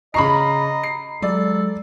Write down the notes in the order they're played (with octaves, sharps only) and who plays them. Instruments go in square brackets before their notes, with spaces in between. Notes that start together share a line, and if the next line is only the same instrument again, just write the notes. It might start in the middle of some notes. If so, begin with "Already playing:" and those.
[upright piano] C#3 C#6 C7 [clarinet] D#5 [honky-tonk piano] A#5 B5
[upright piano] C7
[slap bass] F#3 G#3 [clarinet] A4 [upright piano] D5